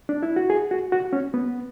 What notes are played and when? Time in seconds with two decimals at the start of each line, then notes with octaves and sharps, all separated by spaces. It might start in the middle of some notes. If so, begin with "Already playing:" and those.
0.09 D4
0.23 E4
0.36 F#4
0.50 G#4
0.71 F#4
0.92 F#4
1.13 C#4
1.34 B3